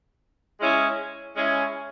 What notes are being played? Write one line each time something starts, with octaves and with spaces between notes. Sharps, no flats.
G#3 C#4 E4 G#4
G#3 C#4 E4 G#4